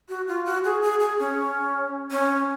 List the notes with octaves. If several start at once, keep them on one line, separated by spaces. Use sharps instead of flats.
F#4
F4
F#4
G#4
G#4
G#4
C#4
C#4